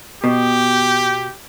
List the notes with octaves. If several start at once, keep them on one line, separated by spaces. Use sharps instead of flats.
B2 G4